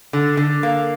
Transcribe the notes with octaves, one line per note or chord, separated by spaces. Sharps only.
D3
D3
A#3